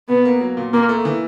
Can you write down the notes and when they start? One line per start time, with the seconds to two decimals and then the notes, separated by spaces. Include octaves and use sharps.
0.09 B2 B3
0.25 A#3
0.41 F#3
0.57 A#2
0.73 A#2 A#3
0.89 A3
1.05 E3